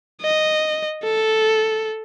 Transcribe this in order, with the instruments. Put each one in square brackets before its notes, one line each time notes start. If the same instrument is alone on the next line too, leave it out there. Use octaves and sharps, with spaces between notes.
[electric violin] D#5
A4